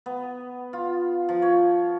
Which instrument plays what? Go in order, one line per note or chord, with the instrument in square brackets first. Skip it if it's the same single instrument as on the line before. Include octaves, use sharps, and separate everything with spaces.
[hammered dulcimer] B3
F4
F3
C#5